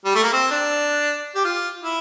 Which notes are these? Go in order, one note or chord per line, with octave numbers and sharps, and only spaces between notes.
G3
A3
A#3
C4
D4
G4
F4
E4